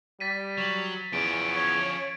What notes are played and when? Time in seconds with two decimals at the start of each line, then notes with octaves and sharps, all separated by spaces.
0.20 G3 A6 B6 D#7
0.58 F#3
1.13 E2 F3 C#4 D7
1.54 C#5